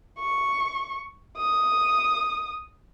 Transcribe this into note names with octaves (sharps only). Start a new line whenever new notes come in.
C#6
D#6